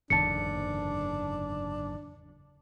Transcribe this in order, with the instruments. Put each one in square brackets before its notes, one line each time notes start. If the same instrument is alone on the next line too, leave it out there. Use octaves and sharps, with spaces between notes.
[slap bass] F#1 G#2 D3 [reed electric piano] E2 A5 [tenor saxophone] D4 [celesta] C#7